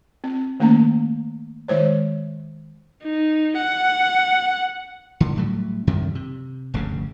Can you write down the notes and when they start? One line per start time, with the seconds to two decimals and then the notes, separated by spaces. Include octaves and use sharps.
0.24 C4
0.60 D#3 A3 A#3 C#4 A#5
1.68 D#3 G#3 C5 C#5
3.03 D#4
3.57 F#5
5.20 D3
5.36 A2 F#3 G3
5.87 F#2 C3 D#3 G3
6.15 C3
6.74 F1 D2 G2 C#3